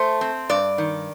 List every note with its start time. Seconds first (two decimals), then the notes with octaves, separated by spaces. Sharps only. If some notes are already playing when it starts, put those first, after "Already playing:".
Already playing: A3 C5
0.21 C4
0.49 G2 D5
0.78 D#3